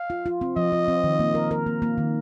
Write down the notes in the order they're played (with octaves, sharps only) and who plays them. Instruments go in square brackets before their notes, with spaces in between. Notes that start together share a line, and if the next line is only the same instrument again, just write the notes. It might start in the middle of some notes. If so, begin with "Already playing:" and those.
Already playing: [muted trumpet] F5
[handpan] F4
F4
C4
[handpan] F3 [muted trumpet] D#5
[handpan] F4
C4
D#3
A#3
A#4
A#4
A#3
A#3
D#3